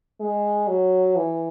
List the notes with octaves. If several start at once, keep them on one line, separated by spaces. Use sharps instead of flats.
G#3
F#3
E3